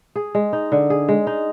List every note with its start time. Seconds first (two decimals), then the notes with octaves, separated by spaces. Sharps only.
0.16 G#4
0.35 G#3
0.53 D#4
0.72 D3
0.90 G#4
1.09 G#3
1.27 D#4